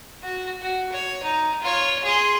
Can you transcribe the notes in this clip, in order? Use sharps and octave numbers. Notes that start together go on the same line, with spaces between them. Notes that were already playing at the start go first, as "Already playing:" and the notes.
F#4
F#4
C#5
D#4
F4 C#5
G#4 C6